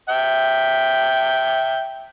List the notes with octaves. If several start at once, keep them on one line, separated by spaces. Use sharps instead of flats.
E5 G5